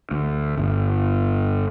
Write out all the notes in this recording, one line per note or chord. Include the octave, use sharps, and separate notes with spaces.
D2
G1